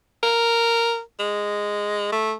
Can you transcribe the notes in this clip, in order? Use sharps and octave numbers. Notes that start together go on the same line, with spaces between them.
A#4
G#3
A3